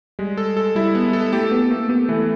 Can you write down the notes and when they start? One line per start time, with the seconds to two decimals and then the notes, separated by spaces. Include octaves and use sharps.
0.19 G3 G#3
0.38 A4
0.57 A4
0.75 G3 E4
0.95 B3
1.13 A4
1.33 A3 G4
1.52 B3 G4
1.71 A3 A#3
1.89 B3 G4
2.09 E3 A3